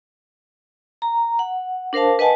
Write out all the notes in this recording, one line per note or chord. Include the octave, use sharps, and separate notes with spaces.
A#5
F#5
D4 A#4 C5 F5 A5
B4 D#5 F#5 G#5 A5